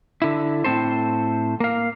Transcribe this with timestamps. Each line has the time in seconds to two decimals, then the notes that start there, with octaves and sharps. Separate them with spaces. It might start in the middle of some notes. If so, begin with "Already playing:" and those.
0.22 D3 E4
0.64 A2 C4 A4 C5
1.60 A#3 F5